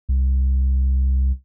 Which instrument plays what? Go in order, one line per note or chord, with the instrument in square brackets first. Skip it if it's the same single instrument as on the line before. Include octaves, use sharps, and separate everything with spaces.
[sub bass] C2